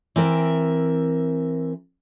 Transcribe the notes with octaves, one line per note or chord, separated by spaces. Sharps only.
E3 C4 A#4 E5